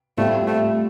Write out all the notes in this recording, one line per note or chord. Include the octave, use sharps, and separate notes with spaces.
A2 G3 A3 C4 F4
A3